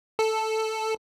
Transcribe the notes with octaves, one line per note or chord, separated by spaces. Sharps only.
A4